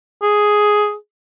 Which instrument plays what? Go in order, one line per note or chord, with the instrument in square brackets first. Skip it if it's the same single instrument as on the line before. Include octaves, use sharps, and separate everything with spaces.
[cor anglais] G#4